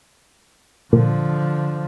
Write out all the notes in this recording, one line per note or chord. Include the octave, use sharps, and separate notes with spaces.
A#2 D3 F3